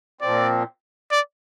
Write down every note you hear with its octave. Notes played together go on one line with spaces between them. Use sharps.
A#2 F3 C4 D5
D5